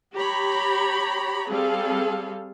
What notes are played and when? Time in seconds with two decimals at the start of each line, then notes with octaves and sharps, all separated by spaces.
0.14 G4 C#5 A#5 B5
1.50 G3 C4 G#4 A4 F5